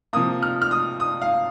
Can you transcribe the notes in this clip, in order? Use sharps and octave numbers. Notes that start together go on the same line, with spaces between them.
C3 F3 A#3 D#6
F6
F6
D#6
D#6
F5